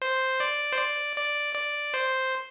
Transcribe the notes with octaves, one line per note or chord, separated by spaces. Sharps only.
C5
D5
C5
D5
D5
D5
C5